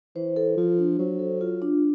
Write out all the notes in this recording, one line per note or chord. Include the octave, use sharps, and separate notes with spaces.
E3 C5
A4
F3 F4
D4
F#3 C5
A4
F4
D4